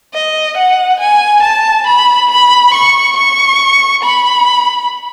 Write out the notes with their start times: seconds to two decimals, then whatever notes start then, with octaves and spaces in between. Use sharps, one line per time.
0.14 D#5
0.57 F#5
1.00 G#5
1.43 A5
1.87 B5
2.31 B5
2.74 C#6
3.17 C#6
4.04 B5